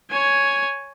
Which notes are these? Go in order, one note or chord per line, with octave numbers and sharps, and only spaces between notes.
C#5 G#5